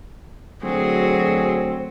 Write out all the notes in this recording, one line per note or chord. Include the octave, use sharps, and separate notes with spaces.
D2 F#3 C4 G#4